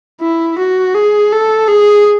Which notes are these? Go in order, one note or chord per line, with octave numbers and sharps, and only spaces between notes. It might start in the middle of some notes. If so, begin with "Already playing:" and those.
E4
F#4
G#4
A4
G#4